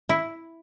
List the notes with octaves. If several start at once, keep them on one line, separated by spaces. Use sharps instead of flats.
E4